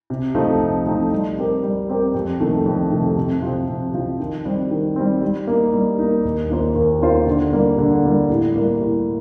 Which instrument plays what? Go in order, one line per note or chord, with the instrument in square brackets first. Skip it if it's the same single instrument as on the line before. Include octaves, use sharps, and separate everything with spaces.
[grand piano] C3
F3 A3 C4 D#4
C3
F3 A3 C4 D#4
G3
C4 G4 A#4
G3
C4 G4 A#4
F2
C3 D#3 A3
F2
C3 D#3 A3
C3
F3 C4
C3
F3 C4
D#3
G3 C4
D#3
G3 C4
G3
A#3 D#4
G3
A#3 D#4
D#2
D#3 A#3 F4 C5
D#2
D#3 A#3 F4 C5
D3
G3 A#3
D3
G3 A#3
A2
G3 A#3
A2